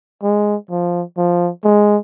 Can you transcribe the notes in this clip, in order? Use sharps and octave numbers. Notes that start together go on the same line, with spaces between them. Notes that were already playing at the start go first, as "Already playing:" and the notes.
G#3
F3
F3
G#3